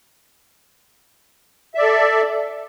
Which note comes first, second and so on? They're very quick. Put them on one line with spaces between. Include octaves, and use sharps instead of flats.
E5 D5 A4